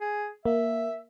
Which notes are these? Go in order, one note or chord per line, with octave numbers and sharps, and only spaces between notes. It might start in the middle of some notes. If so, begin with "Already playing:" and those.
G#4
A#3 E5